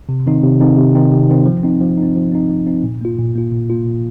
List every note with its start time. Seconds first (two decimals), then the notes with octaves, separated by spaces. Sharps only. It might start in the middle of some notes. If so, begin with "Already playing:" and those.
0.09 C3
0.27 D#3 C4 D#4
0.43 C3
0.60 D#3 C4 D#4
0.78 C3
0.95 D#3 C4 D#4
1.12 C3
1.29 D#3 C4 D#4
1.46 F3
1.64 C4 D#4
1.81 F3
1.97 D#4
2.03 C4
2.16 F3
2.32 C4 D#4
2.50 F3
2.67 C4 D#4
2.84 A#2
3.01 A#3 F4
3.18 A#2
3.35 A#3 F4
3.52 A#2
3.70 A#3 F4
3.87 A#2